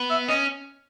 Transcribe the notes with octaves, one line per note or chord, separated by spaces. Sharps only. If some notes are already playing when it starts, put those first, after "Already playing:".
Already playing: B3
E5
C#4 D#5